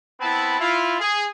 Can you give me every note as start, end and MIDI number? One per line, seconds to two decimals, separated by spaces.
0.21 0.57 59
0.21 0.57 60
0.21 0.57 64
0.21 0.57 81
0.21 0.57 83
0.60 0.96 64
0.60 0.96 65
1.00 1.26 68